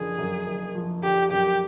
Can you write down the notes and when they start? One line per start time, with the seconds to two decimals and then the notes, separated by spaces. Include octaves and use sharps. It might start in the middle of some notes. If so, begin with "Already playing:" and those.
Already playing: F#1 D3 F3 G#4
0.18 F#2
0.47 F#1
0.75 F3
1.03 D3 G4
1.31 F#2 G4